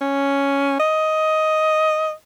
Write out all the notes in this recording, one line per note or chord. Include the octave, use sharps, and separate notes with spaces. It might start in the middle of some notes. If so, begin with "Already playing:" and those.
C#4
D#5